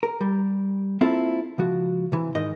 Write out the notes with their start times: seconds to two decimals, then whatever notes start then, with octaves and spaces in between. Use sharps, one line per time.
0.03 A#4
0.21 G3
1.01 A#3 C4 E4 F4 A4
1.58 C#2 F3 F#4
2.12 C3 E3
2.35 G#2 D#3 D#5